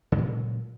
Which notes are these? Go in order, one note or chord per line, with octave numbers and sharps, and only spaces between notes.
A#2 C#3 F#3 G#3